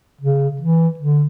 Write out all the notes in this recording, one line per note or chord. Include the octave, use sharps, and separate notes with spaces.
C#3
E3
D3